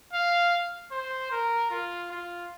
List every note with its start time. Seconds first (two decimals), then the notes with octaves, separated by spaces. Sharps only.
0.13 F5
0.92 C5
1.31 A#4
1.71 F4
2.11 F4